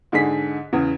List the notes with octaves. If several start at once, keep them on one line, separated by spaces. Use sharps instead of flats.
G#2 D3 G#4 B6
E2 C#3